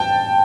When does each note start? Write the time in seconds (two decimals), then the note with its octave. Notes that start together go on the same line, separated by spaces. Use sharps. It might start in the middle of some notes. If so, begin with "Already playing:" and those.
Already playing: G5 A5